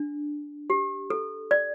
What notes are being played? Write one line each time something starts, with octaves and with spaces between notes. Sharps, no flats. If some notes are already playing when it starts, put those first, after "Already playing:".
Already playing: D4
G4
A4
D5